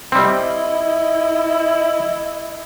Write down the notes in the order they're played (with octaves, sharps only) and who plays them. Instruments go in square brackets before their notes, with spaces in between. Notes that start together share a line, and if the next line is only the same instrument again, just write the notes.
[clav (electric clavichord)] G3 C4 [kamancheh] E4 D#5